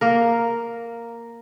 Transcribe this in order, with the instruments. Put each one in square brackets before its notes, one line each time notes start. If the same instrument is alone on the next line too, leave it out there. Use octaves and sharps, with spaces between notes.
[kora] A#3 A#4